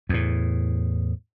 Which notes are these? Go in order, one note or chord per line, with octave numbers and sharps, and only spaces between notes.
E2 A2